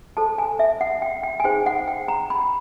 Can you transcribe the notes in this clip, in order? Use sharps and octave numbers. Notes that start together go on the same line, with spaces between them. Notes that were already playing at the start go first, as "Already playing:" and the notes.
F4 A4 C5 A5
G#5
E5
F#5
G5
G5
G#5
D#4 G#4 C5 G5
F#5
G5
A#5
B5